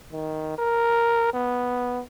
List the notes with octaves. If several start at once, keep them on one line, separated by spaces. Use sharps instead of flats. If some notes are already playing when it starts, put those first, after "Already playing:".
D#3
A#4
B3